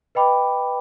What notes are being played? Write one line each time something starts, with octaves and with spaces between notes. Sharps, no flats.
B4 D#5 G5 B5 D6